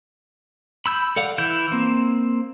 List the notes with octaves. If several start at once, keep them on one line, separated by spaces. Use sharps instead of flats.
B5 E6 G6
A4 D5 F5 F#5
E3 E4 G6
A#3 C4